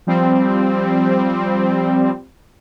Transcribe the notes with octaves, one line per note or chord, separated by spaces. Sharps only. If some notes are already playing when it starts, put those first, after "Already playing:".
F3 G3 C4